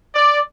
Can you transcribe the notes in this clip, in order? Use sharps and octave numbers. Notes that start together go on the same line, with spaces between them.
D5